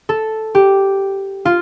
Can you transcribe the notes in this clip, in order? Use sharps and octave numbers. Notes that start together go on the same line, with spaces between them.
A4
G4
F4